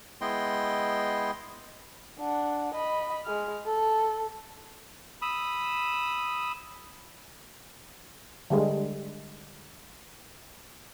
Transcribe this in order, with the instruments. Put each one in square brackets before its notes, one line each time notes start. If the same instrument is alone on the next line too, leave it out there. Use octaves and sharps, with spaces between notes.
[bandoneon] G#3 B3 E4 D#5 G5 C6
[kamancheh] D4 F#5
D#5 B5
G#3 F6
A4
[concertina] B5 D#6 E6
[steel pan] D3 G3 G#3